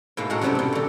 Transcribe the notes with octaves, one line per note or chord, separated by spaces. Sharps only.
G#2 B2 A#3 E4
A2 G#3 F#4 F#5 A#5
F#2 C3 F#3 G3 A3 D4
G2 B2
A#2 D3